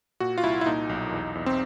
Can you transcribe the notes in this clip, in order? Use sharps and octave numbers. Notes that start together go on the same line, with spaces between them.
A#2 F#4
F4
C2 E4
E4
A#2 D#4
B1
E2
E2
C4